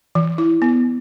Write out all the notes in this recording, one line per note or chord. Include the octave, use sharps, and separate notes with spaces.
E3
E4
B3